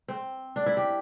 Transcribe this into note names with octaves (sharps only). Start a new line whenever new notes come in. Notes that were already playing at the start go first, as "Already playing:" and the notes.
C4
D4
E4
G4